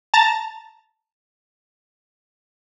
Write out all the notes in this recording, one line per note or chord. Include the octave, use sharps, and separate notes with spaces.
A5 A#5 A6